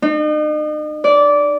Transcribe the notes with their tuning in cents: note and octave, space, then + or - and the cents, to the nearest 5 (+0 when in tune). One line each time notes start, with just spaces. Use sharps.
D#4 -40
D5 -15